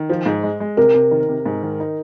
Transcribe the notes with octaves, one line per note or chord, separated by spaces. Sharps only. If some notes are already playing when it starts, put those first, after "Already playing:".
Already playing: D#3
F3
G#2
G#3
G#3
C3 A#4
C3
D#3
C3
G#2
D#3
D#4